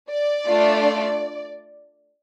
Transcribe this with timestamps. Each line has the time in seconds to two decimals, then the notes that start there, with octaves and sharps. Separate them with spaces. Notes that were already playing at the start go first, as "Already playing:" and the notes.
0.10 D5
0.47 A3 D4 F4